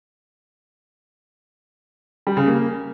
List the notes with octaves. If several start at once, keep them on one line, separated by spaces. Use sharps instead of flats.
G3
C#3
A#3